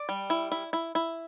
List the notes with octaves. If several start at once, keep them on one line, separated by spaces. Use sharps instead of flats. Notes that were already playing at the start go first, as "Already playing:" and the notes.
Already playing: D5
G3
E4
E4
E4
E4